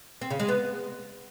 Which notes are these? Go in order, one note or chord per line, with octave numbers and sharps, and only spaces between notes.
C4
C#3
G#3
B3